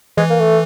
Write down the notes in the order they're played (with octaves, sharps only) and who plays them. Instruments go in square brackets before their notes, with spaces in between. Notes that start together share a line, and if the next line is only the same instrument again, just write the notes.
[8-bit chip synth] E3 [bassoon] G#3
[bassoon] A#3
A3